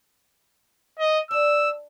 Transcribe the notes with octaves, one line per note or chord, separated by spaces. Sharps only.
D#5
D4 E6